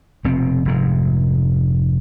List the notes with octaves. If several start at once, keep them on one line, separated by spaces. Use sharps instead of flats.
F1 B2 C4
F1 G#2